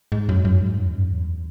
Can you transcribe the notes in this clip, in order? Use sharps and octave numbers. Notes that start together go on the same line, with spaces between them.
G#2
F#2
F#2
G#2
F#2
E2
F#2
E2